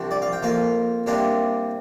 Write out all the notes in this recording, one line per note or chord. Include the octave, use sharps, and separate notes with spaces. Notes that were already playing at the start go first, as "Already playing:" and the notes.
Already playing: C2 C3 F3 D4
D5
F5
G5
F2 F3 A#3 F4 F5
C3 G3 A#3 D4 F4